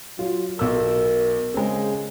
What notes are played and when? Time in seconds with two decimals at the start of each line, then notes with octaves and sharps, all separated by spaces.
0.19 F#3 F4
0.59 B1 A#4 E6
1.54 C#3 G#3 C4